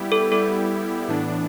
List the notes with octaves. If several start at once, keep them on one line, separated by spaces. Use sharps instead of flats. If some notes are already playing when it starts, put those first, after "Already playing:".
Already playing: G3 B3 E4 G4
A4
G3 B3 E4 G4 A4
A2 E3 B3 D4